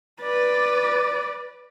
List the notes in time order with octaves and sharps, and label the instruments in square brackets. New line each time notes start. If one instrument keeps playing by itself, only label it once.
[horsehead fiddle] B4 D5